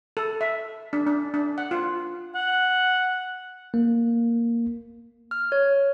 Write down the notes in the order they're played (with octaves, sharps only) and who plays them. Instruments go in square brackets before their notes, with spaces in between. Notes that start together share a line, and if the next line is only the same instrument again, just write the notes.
[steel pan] A4
E5
D4
D4
D4
F#5
F4
[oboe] F#5
[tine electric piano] A#3
[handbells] F6
C#5